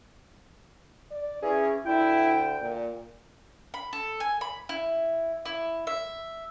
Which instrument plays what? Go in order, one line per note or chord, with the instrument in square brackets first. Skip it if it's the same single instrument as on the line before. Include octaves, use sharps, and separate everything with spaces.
[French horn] D5
[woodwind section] E3 C#4 [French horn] G#4
[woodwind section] D2 D3 G5 [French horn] E4
[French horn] A#2
[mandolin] B5
A4
G#5
B5
E4
E4
E5